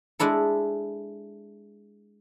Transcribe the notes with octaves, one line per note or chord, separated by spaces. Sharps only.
G#3 D4 E4 A4